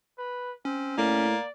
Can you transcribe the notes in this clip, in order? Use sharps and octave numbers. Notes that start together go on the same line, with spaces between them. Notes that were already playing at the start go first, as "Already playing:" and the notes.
B4
C4 C#4
A2 A#3 D5